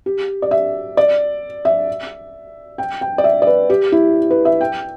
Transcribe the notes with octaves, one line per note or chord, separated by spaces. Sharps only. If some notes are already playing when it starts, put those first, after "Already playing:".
G4
D5
E5
D5
E5
G5
G5
D5
E5
D5
B4
G4
E4
B4
E5
G5